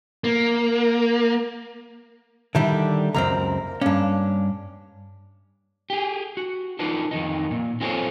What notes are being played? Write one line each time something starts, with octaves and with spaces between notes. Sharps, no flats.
A#3
D3 D#3 G3 D4 E4
C#2 F#2 A#2 A#3 C4 A#5
G2 A#3 C#4 D4
G4 G#4
F#4
D4 D#4 F4 B4
F2 D#3 D#4
A#2
C4 F4 G#4 A4 C5 C#5